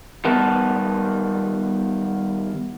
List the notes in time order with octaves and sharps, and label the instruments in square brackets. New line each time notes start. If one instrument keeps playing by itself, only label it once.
[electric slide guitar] D#3 G3 B3 A#4 B4 A5